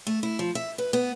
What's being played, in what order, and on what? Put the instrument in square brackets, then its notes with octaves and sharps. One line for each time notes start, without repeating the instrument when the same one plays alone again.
[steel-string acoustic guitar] A3
E4
F3
E5
B4
B3